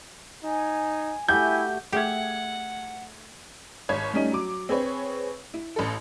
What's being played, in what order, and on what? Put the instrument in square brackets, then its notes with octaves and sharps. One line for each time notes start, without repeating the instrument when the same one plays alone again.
[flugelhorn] D#4 [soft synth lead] G#5
[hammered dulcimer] A3 F#4 G4 [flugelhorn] E4 [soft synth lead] G#5 [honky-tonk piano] G6
[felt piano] A3 G#6 [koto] G4 [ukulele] G#4 E5 [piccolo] F#5
[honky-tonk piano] G#1 C#5 G#6
G3 A3 C#4 D#4
F#3 D6
C4 G#4 B4 C#5
E4
A1 A4